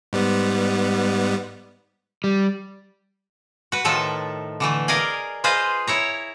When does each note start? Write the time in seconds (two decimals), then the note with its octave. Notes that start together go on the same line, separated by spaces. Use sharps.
0.13 G#2 G3 B3
2.24 G3
3.72 F#4 B4
3.85 A2 D#3 F3 A4 E5 A5
4.60 D3 E3 A3
4.88 G#4 A#4 D5 D#5 F5 G#5
5.44 F4 G#4 B4 C5 D#5 F5
5.87 E4 C#5 A#5